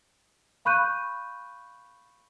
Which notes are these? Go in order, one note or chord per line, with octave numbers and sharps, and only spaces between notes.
F5 B5 C#6 F#6 G6 D#7